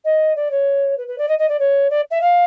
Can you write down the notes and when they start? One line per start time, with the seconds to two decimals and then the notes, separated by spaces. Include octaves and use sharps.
0.04 D#5
0.35 D5
0.51 C#5
0.97 B4
1.07 B4
1.18 D5
1.28 D#5
1.38 D#5
1.48 D5
1.59 C#5
1.90 D5
2.10 E5
2.21 F5